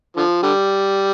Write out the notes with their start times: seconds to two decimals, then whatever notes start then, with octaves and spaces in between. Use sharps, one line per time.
0.17 D3 F3
0.43 D3 G3